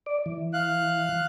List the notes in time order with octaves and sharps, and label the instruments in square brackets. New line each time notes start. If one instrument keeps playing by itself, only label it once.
[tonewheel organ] D5
E3
[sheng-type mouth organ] F5 F#6